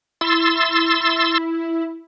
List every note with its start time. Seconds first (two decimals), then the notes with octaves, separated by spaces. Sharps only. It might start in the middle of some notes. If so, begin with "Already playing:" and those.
0.21 E4 C6 E6 A6